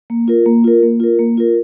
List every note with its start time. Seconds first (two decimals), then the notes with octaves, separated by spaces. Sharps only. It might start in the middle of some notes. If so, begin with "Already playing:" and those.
0.10 A#3
0.28 F4 A#4
0.46 A#3
0.64 F4 A#4
0.83 A#3
1.00 F4 A#4
1.19 A#3
1.37 F4 A#4